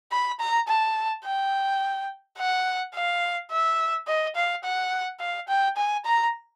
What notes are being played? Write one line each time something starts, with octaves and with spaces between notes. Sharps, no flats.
B5
A#5
A5
G5
F#5
F5
E5
D#5
F5
F#5
F5
G5
G#5
A#5